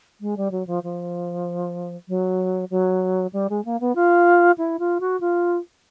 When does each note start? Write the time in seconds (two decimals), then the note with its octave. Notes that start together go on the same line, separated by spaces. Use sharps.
0.21 G#3
0.37 G3
0.51 F#3
0.67 F3
0.83 F3
2.08 F#3
2.71 F#3
3.33 G3
3.50 G#3
3.65 A#3
3.80 B3
3.95 F4
4.58 E4
4.79 F4
5.00 F#4
5.20 F4